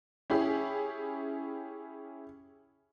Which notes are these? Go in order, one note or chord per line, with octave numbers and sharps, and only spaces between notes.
C#4 E4 G4 G#4